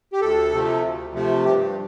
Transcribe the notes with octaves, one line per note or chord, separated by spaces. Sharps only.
G4
D2 A4
C3 F3 A3
D2
C3 F3 A3
G2 G4